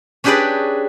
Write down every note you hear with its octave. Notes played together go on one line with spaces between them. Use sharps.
C#4 D4 G4 G#4 B4 D5